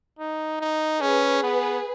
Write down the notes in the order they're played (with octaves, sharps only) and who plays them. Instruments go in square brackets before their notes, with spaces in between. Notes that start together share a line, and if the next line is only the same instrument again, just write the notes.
[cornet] D#4
D#4
[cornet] C#4 [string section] G#4 B4
[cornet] B3